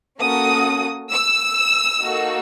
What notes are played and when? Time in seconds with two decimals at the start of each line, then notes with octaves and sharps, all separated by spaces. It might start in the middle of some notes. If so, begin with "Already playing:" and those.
0.21 A#3 C#4 F#4 A4 D#6
1.10 E6
2.01 A#3 D#4 F#4 A4